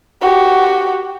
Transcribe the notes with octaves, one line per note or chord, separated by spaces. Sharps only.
F#4 G4